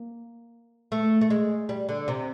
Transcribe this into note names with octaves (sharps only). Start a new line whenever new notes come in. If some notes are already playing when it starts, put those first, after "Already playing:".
Already playing: A#3
A3
A3
G#3
G3
D3
C3